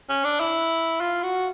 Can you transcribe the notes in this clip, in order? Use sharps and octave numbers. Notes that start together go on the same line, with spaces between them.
C#4
D4
E4
F4
F#4